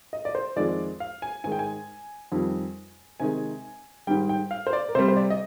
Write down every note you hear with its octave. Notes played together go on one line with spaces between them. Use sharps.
D#5
D5
C5
F2 D#3 G#3 D5
F5
G#5
G#2 D#3 G#3 G#5
G5
G#5
F2 D#3 G3
C3 D#3 G#3 G#5
G#2 D#3 G3 G5
G5
F5
C5
D5
A#4
C3 G3 C5
C5
D5
D#5